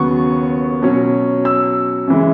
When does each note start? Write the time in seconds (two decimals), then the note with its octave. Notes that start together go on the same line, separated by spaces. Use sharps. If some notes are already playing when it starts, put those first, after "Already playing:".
Already playing: D#2 C#3 F#3 B3 C#6
0.82 B2 F#3 C#4
1.45 E6
2.07 F#2 C#3 E3 G#3